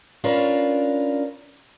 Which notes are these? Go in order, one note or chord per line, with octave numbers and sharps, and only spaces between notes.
C#4 D4 F4 A#4 B4